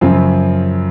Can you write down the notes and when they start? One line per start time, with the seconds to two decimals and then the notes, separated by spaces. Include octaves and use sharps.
0.01 F#2 C#3 F3 C4 F4